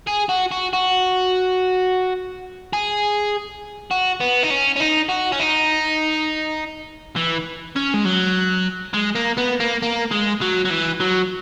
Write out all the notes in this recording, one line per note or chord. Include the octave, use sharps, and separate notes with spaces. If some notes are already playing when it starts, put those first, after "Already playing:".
G#4
F#4
F#4
F#4
G#4
F#4
B3
D#4
C#4
C#4
D#4
F#4
C#4
D#4
E3
C#4
G#3
F#3
G#3
A#3
B3
A#3
A#3
G#3
F#3
F#3
E3
F#3